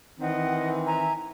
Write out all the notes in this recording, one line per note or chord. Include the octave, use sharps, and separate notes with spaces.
D#3 E3 C4 D#5 F#5
E5 G#5 A#5